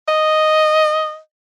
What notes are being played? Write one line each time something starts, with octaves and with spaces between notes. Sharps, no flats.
D#5